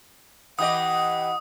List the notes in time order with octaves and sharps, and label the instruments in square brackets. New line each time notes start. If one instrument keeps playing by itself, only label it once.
[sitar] E3 G4 D#5 [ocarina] F#5 [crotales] D#6